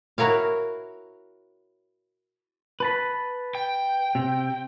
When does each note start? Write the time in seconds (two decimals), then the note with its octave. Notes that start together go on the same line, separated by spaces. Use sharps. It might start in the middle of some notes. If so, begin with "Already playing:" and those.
0.18 E4 F#4 A#4 C#5 F5
2.80 B4 A5 B5
3.55 G5
4.15 C3